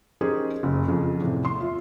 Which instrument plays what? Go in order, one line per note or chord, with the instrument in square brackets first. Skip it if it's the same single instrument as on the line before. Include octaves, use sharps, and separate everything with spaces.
[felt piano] C#4 D#4 G4 G#4 A#4 C5
F#1
F2 C#3 F3
E2 A2 C3
C6
F4 E5